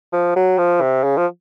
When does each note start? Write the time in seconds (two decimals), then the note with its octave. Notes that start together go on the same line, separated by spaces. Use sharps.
0.13 F3
0.36 F#3
0.58 F3
0.81 C3
1.04 C#3
1.17 F3